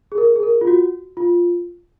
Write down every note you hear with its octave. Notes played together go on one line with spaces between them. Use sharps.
G#4
A#4
G#4
A#4
F4
F#4
F4